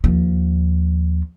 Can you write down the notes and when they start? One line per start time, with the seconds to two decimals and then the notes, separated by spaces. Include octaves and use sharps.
0.04 D#2 F3